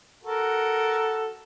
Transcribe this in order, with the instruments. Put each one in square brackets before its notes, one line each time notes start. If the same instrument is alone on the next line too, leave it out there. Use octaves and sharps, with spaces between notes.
[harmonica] F#4 A4 A#4